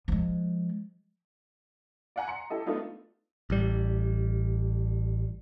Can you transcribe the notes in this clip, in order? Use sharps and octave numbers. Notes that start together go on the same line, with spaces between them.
F3 G#3
D5 F5 F#5 G#5 A#5
A#5 C6 C#7
E4 G4 A4 D#5
A3 B3 D4 D#4 F4
A1 G3